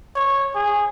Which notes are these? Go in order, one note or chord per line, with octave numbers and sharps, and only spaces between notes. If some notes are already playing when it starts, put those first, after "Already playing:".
C#5
G#4